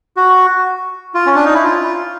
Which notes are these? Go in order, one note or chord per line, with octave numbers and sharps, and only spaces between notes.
F#4
F4
C#4
D4
D#4
E4
F4